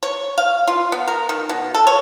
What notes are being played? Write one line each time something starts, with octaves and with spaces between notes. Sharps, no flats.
C#5
F5
F4
B3
A#4
D#3
B2
A4
C#5